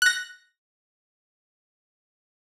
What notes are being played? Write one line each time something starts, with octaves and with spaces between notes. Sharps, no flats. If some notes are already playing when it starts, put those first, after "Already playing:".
F#6 A#6